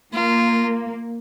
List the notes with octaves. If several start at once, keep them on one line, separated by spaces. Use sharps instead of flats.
A#3 F4